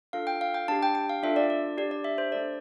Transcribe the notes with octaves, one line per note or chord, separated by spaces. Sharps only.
D4 F4 A4 F5
G5
F5
G5
D4 G4 A5
G5
G5
F5
D4 F4 A4 E5
D5
D5
D4 G4 D5
D5
E5
C5
A3 D4 A4 D5